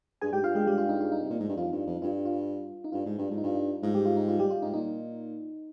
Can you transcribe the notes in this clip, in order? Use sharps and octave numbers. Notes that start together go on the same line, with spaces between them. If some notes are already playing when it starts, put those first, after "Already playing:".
G2 G#4 G#5
G#2 G4 G5
G2 F4 F5
G#3 G#4
G3 G4
F4
D#4
F4
D#4
C3
A#2
G#2
G2
F2 F4
G2
F2
G2 F4
F4
D#4
G2 F4
G#2
G2
G#2
D#4
G2 F4
D#4
G#2 F4
G3 G4
F4
D#4
F4
G3 G4
F4
G#2 D#4
A#2 D#4